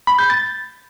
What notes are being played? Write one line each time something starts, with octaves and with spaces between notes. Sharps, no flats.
B5
G6
A6